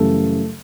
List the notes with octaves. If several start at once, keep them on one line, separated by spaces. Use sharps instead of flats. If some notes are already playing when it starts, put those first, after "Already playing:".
Already playing: F#2 C#3 E3 G3 A3 A4